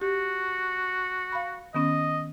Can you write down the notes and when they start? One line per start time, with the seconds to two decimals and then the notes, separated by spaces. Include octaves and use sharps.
0.01 F#4 G4
1.32 F5 B5
1.75 D#3 B3 C#4 D#5